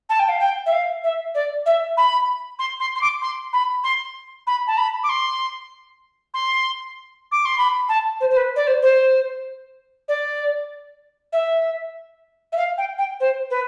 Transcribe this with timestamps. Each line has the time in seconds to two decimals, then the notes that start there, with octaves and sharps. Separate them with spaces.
0.09 A5
0.19 G5
0.28 F5
0.39 G5
0.66 E5
0.72 F5
1.03 E5
1.34 D5
1.66 E5
1.97 B5
2.59 C6
2.80 C6
2.95 C6
3.01 D6
3.21 C6
3.53 B5
3.83 C6
4.47 B5
4.67 A5
4.77 B5
5.03 D6
5.09 C6
6.34 C6
7.31 D6
7.45 C6
7.58 B5
7.88 A5
8.20 C5
8.30 C5
8.36 B4
8.56 D5
8.67 C5
8.82 C5
10.08 D5
11.32 E5
12.52 E5
12.57 F5
12.77 G5
12.98 G5
13.20 C5
13.50 B4